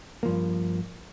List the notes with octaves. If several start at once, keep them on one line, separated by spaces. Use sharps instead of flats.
G2 F3 A#3